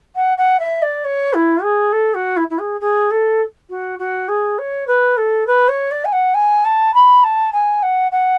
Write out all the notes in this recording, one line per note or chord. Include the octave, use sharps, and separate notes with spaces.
F#5
F#5
E5
D5
C#5
E4
G#4
A4
F#4
E4
E4
G#4
G#4
A4
F#4
F#4
G#4
C#5
B4
A4
B4
C#5
D5
G#5
F#5
G#5
A5
B5
A5
G#5
F#5
F#5